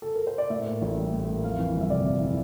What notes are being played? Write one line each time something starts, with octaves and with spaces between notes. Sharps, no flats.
A4
A#4
C5
D5
A2 E5
A#3
A1
G3
A2
A#3
F2 F5
E3
G1
E5
C3 D5
F2
E3